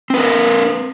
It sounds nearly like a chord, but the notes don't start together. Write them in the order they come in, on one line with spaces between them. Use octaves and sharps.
C4 B4 A#4